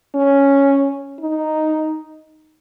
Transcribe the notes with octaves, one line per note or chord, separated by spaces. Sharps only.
C#4
D#4